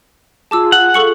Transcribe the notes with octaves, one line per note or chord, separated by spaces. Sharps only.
F4 G#4 A5 D6 E6
F#5
A4 C#6 C#7